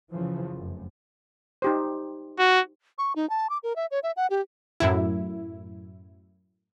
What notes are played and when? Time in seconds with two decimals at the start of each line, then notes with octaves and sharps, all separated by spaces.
0.11 F#2 C#3 E3 F3
0.53 F1 F#2
1.62 D#4 G4 C5
2.39 F#4
2.98 C#6
3.16 D#4
3.30 A5
3.50 D6
3.63 A#4
3.76 E5
3.91 C#5
4.03 E5
4.17 F#5
4.30 G4
4.80 F#2 A2 E4